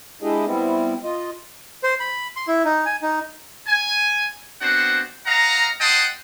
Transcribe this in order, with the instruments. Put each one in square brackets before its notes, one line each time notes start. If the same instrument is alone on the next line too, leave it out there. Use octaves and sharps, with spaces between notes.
[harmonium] G#3 D4 E4 G4 G#4 D#5
G3 B3 C4 E4
F4 D#5
[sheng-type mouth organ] C5
B5
C6
E4
D#4
G#5
D#4
[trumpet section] G#5
B3 C4 D4 F#4 C5 F#5
D#5 F5 F#5 A#5
D#5 F#5 G5 A5 C6 D#6